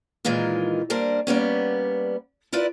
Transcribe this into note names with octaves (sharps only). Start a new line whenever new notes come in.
A#2 D#3 E3 G#3 D#4 F4
G3 A#3 D4 A#4 C5
G3 A#3 B3 C#4
E4 F4 A#4 B4 D5